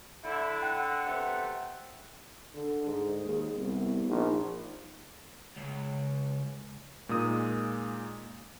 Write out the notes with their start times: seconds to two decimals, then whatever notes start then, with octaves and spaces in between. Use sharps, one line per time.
0.23 D3 E4
0.62 F#5 G5 F#6
1.06 C3 A3 B3
2.54 D3
2.86 G#2 G#4
3.23 D#2
3.55 C2 B3
4.07 A#1 D#4
5.56 C#2
7.09 A#2 G#3 A#3 D#4 D#6